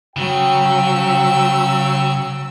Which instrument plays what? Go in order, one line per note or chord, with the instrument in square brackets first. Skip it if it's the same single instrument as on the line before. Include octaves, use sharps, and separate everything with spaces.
[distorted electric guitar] C#3 [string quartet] F#3 E6 [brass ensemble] G5